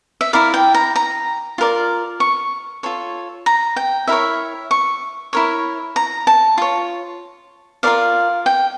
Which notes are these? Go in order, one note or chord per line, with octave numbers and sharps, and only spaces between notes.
E5
E4 A#4 D5 F5
G5
A#5
A#5
F4 A#4 D5
C#6
F4 A4 C#5
A#5
G5
E4 A#4 C#5 E5
C#6
E4 A#4 C#5
A#5
A5
F4 C#5
F4 A#4 D5 F5
G5